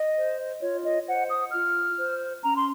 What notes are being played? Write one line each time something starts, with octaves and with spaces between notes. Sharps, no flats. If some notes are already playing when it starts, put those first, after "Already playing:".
Already playing: D#5
C5
F4 C#5
D#5
C5 F#5
D#6
F4 F6
C5
C#4 A#5
C6